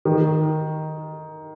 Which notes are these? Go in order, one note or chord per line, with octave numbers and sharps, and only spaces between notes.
D#3